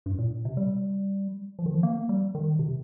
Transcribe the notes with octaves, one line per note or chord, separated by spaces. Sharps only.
G2
A#2
C3
G3
F3
D#3
F3
A#3
G3
D#3
C3